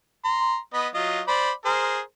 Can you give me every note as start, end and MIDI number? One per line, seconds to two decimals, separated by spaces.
0.25 0.57 82
0.25 0.57 84
0.74 0.88 59
0.74 0.88 75
0.74 0.88 83
0.95 1.21 54
0.95 1.21 65
0.95 1.21 75
1.28 1.51 72
1.28 1.51 74
1.28 1.51 83
1.65 2.00 68
1.65 2.00 70
1.65 2.00 72